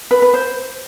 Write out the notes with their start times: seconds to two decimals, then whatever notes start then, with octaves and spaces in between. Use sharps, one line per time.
0.11 B4
0.22 B4
0.34 C5